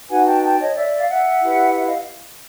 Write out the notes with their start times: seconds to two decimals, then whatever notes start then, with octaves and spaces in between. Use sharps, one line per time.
0.09 D#4 F#4 B4 F#5 G#5
0.26 G5 A5
0.42 G5 A5
0.59 C#5 D#5
0.76 D5 E5
0.97 F5
1.09 E5 F#5
1.42 E4 G4 B4
1.74 E5 F#5
1.85 D#5 F5